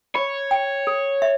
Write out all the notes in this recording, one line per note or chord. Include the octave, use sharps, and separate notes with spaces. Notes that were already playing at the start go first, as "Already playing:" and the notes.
C#5 B5
G5
A4
E5